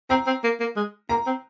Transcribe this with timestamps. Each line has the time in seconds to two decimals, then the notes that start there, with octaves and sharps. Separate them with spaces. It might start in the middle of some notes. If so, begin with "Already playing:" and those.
0.10 C4 A#5
0.27 C4
0.44 A#3
0.60 A#3
0.76 G#3
1.09 A#3 A#5
1.26 C4